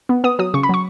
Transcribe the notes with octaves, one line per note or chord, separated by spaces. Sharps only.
B3
B3 D#6
F#3 D#6
C#3 C#6
B5
F#3 C#6